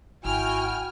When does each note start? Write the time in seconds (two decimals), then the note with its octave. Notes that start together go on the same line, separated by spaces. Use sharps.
0.25 G#1 E4 F#4 G5 G#5 F6